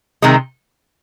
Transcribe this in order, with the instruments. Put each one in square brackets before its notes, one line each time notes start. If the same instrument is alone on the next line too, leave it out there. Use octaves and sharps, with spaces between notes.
[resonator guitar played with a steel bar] C3 D#3 G#3